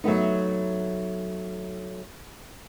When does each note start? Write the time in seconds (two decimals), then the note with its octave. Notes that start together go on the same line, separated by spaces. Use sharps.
0.04 F#3 A3 B3 D#4